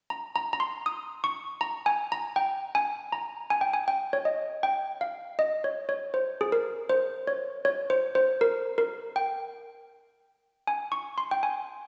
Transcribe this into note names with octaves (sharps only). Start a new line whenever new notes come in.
A#5
A#5
A#5
C6
D#6
C#6
A#5
G#5
A#5
G5
G#5
A#5
G#5
G5
G#5
G5
C#5
D#5
G5
F5
D#5
C#5
C#5
C5
G#4
A#4
C5
C#5
C#5
C5
C5
A#4
A#4
G5
G#5
C#6
C6
G5
G#5